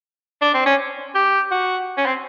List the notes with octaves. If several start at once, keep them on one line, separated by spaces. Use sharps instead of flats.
D4
C4
C#4
G4
F#4
C#4
C4